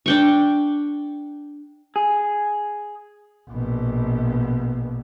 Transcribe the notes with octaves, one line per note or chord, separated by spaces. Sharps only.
D4 G5 C#6
G#4
A#1 B2